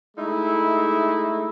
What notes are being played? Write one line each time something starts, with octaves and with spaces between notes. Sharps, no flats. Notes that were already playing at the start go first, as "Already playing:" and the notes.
G#3 A3 D#4 E4